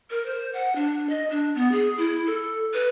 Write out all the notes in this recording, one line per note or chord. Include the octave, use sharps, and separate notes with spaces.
A#4
C5
F#5
D4
D#5
D4
B3
G#4
E4
A4
B4